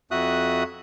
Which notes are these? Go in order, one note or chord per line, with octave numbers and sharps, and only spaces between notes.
F2 F#4 E5 D#6 F#6